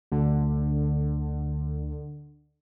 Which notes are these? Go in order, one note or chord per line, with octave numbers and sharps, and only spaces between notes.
D2 D3